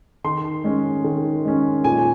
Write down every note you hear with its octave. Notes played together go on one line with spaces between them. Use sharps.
D#3 C6
G#3 C#4
D#3
G#3 C#4
A#2 G#5